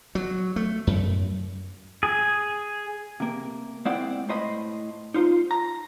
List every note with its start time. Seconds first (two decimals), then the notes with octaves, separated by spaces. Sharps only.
0.15 F#3
0.56 A3
0.87 F#2
2.03 G#4
3.20 C3 A#3
3.85 G#3 C4 E4 C5 D5 F#5
4.29 A2 C5 D#5 B5
5.14 D#4 F4 C5
5.51 A#5